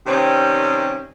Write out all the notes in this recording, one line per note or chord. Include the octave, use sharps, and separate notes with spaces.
C3 D#3 G3 C4 C#4